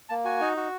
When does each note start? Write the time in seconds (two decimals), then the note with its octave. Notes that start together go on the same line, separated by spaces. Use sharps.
0.09 A#3 A5
0.25 F#4 G#5
0.41 D#4
0.57 F#4